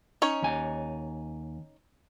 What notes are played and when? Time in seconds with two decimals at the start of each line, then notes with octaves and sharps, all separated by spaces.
0.22 C#4 D#4 C#5
0.42 D#2 G#5